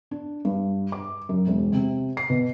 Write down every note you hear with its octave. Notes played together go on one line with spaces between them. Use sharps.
D4
G2
D6
F#2
E1
C3
C7
B2